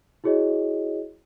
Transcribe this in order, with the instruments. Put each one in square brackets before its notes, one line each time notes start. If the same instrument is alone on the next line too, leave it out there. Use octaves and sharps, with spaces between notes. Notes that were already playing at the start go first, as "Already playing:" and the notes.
[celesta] E4 F#4 G#4 C#5 D#5